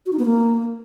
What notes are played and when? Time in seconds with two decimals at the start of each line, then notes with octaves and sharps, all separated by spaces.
0.06 F#4
0.13 D#4
0.19 B3
0.26 A#3